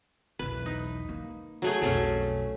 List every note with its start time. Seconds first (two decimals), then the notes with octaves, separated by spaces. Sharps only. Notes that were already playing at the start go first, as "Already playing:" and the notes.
0.39 B1 E2 B4
0.66 D#4
1.09 A#3
1.62 F#3 A3 G#4
1.82 B1 F2 F#3 A3 C#4